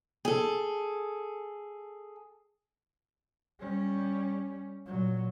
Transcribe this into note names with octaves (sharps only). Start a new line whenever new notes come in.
G#4 A4
G3 C#4
A#2 F#3